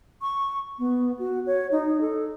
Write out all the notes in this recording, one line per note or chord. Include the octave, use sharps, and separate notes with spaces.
C#6
B3
F#4
C#5
D#4
A4